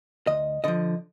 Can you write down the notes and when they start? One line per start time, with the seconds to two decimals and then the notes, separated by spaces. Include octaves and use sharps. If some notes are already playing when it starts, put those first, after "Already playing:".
0.27 D2 D#5
0.64 D3 F3 D#5